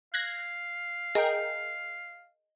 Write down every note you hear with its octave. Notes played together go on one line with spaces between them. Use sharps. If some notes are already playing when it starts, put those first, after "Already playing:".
F5 F#6 G#6 A#6
G#4 A#4 D#5 G5